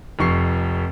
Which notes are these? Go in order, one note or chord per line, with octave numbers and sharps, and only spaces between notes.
F1 F2 C#6 C7